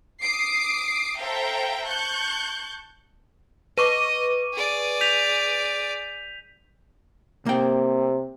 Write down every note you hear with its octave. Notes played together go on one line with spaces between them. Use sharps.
D6 D#6 C7 D7
A4 C5 E5 F5 G5 A#5
A5 C#6 F#6 G6
B4 D#5 C#6 D6 D#7
G#4 D5
G6 B6 F7
C3 A#3 G5